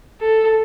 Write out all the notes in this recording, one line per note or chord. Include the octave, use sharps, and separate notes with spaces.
A4